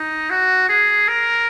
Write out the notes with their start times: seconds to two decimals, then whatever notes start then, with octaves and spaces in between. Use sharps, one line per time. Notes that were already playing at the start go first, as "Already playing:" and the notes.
Already playing: D#4
0.30 F#4
0.69 G#4
1.08 A#4